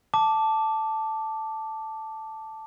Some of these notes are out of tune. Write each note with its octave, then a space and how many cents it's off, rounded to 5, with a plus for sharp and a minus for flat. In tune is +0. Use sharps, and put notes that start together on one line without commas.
A5 +0 D6 +0